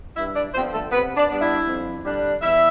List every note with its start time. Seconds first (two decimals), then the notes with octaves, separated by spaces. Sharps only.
0.16 G2 E4 E5
0.35 D4 D5
0.54 D3 F3 B3 C4 C5
0.72 A3 A4
0.91 C3 B3 B4
1.16 D4 D5
1.29 G3 B3 D4
1.41 E4 E5
1.66 F2
2.03 D3 G3 D4
2.42 E2 E4 E5